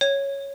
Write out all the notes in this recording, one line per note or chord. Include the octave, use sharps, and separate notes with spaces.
C#5